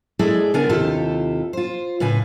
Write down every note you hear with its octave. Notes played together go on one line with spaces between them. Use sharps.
G#3 E4 G#4 A4 D5
C#3 B3 D4 A#4 G#5
D#2 C3 E4 F4 G4 A4
F4 C5
A2 C#3 B4 G#5